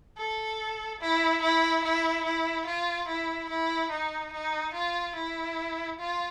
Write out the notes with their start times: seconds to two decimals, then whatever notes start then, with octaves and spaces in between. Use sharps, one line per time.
0.17 A4
1.00 E4
1.42 E4
1.84 E4
2.24 E4
2.67 F4
3.07 E4
3.49 E4
3.91 D#4
4.33 D#4
4.74 F4
5.15 E4
5.99 F4